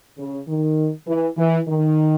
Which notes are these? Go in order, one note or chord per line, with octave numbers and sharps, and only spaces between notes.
C#3
D#3
E3
E3
D#3